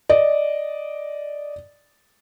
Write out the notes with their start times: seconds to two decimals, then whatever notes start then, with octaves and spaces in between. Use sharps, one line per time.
0.10 D5 D#5